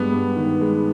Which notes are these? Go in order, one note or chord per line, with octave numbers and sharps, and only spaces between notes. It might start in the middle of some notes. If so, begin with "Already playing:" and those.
Already playing: G2 G#3 B3
G2
D#3
G#3